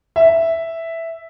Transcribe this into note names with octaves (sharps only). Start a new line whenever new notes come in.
E5